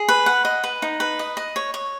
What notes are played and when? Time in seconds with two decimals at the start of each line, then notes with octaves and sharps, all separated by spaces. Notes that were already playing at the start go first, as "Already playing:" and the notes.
Already playing: G#4
0.09 B4
0.26 F#5
0.45 D#5
0.64 B4
0.82 D#4
1.00 B4
1.19 D#5
1.37 D#5
1.56 C#5
1.74 C#5